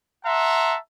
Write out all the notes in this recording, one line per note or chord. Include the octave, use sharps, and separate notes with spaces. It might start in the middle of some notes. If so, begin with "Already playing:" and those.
E5 F#5 A5 A#5 C6